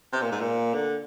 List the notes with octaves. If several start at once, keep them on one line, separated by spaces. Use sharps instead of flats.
C3
A#2
G#2
A#2
D3